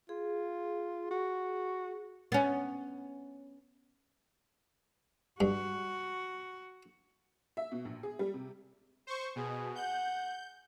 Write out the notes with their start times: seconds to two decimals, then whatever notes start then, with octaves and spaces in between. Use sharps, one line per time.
0.09 F4 G#4
1.11 F#4
2.32 B3 C#4
5.41 G2 F#4
7.57 E5
7.72 B2
7.85 A#1
8.03 G#4
8.19 G3
8.34 C3
9.07 C5 C#6
9.36 B2 G#4
9.75 F#5 G6